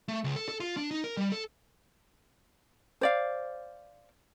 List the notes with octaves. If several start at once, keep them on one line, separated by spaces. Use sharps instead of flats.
A3
C#2
A4
A4
F4
D4
D#4
A#4
G3
A4
C5 D5 F5